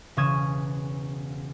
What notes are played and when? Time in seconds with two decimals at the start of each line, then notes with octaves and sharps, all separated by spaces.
0.17 E1 C#3 C#4 D#6 G#6 E7